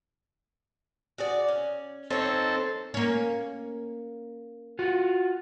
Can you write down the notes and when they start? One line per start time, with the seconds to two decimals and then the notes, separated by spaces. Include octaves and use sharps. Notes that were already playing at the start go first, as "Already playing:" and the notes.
1.18 F#4 G#4 D5
1.48 C#4
2.10 C4 D#4 A4 C#5
2.94 A#3 C#4
4.79 F4 F#4